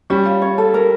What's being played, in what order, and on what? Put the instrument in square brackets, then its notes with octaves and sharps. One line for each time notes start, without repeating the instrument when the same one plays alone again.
[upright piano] G3 [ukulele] C#4
[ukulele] F4
C#5
A4
A#4